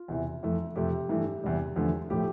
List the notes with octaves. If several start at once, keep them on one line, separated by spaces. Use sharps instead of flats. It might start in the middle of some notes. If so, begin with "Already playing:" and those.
Already playing: F4
E2 C3 E3
F2 E3 A3
F2 C3 F3 A3 G4
G2 E3 A3
E2 C3 G3
E2 D3 F3 A3
A2 F3 A3 G4